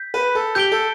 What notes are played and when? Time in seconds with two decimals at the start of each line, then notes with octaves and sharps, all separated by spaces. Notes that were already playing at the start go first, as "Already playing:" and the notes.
Already playing: G6 B6
0.14 B4
0.35 A4
0.55 G4 G6 D7 G7
0.72 A4